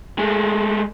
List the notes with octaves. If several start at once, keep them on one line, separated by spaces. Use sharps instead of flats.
G#3 A3